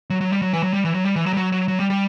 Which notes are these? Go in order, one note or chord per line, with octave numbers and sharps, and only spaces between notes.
F#3
F#3
G3
F#3
E3
F#3
G3
E3
F#3
G3
E3
F#3
G3
F#3
F#3
F#3
G3
G3